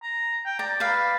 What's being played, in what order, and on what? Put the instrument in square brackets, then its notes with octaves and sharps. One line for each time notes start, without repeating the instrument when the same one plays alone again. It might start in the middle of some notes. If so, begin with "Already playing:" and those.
[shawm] A#5
G5
[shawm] D5 [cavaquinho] A#5
[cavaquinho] B4 F5